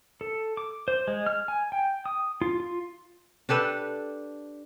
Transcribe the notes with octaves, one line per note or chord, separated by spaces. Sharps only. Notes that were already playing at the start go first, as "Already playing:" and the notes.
A4
D6
C5
G#3
F6
G#5
G5
D#6
F4
F4
D4 G4 A4 B4